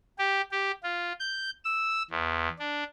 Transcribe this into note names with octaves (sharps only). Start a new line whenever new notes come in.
G4
G4
F4
G6
E6
E2
D4